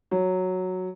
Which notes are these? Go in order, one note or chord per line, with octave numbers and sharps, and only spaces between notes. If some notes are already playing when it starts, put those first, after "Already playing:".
F#3